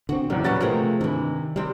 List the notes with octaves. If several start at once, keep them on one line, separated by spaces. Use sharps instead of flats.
D3 C4 F#4
F1 E2 A#2 C#3 F#3 G3
F#2 G3 C#4 F#4 B4 A6
C3 F3 A3 C4 G#4 A#4
G2 D#3 E3
C3 G3 C4